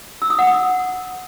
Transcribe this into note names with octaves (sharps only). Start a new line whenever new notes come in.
E6
D#6
F#5
D#6